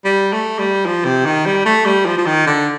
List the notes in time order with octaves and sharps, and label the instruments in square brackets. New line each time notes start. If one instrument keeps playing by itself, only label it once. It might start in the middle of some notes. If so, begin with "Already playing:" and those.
[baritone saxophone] G3
A3
G3
F3
C3
D#3
G3
A3
G3
F3
F3
D#3
D3